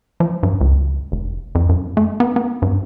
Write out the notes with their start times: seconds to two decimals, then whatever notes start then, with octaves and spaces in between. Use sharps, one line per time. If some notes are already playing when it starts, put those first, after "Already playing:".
0.20 F3
0.43 G2
0.61 C#2
1.12 F1
1.55 F2
1.69 F#2
1.97 A3
2.20 B3
2.36 B3
2.62 G2